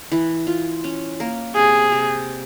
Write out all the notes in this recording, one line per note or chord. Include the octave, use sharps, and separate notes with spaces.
E3
F4
C#4
A#3
C3 G#4
C3